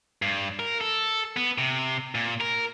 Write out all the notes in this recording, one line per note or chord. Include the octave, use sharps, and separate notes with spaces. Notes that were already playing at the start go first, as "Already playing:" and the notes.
G2
A#4
A4
B3
C3
A#2
A#4